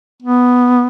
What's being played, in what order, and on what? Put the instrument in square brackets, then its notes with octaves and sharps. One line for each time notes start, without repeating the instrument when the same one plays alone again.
[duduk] B3